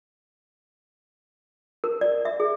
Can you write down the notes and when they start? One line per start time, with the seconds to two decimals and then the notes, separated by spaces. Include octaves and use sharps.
1.84 A#4
2.01 D5
2.25 E5
2.40 G#4